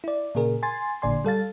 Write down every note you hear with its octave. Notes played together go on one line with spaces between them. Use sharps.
E4 D5
A#2 C#3 G#4 A#4
G#5 C6 A6
A1 A#2 D3 D5 G#5 C6
G3 A4 F5 A6